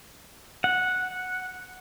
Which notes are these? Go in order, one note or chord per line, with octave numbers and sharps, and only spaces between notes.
F#5